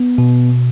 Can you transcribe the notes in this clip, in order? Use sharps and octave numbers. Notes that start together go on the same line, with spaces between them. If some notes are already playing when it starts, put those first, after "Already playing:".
Already playing: B3
B2